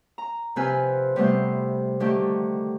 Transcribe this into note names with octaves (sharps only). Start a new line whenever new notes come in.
A#5
C3 F3 C4 B4 G#5 F6
C3 G3 A3 B3 C5
D3 D#3 A3 G4